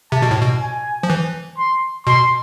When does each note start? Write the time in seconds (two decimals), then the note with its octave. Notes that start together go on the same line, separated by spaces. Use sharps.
0.12 C3 A5
0.22 B2
0.31 A2
0.41 B2
0.61 G#5
1.03 F3
1.10 E3
1.58 C6
2.06 B2 C6